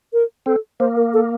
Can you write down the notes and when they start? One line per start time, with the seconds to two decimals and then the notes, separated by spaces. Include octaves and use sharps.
0.13 A#4
0.46 C4 A4
0.80 A#3 C5
0.96 A#4
1.13 A4